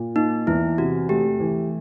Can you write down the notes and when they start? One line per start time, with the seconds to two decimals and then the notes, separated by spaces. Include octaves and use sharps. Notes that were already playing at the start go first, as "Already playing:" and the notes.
Already playing: A#2
0.15 A#3 D#4
0.47 E2 E4
0.78 C3 F#4
1.09 A3 G4
1.40 E3